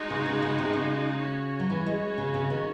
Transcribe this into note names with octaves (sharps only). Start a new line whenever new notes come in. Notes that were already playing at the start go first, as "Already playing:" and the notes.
Already playing: G#3 D#4 F#4
C#3
C#3
C#3
C3
C#3
C#4 F#4 C#5
F#3
E3
G#3
C#3
C#3
D#3